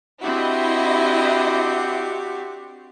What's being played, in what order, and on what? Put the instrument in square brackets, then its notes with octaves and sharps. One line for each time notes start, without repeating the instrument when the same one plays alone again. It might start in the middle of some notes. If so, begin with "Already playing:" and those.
[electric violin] C4 D4 [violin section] E4 D#5 [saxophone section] F#4 G4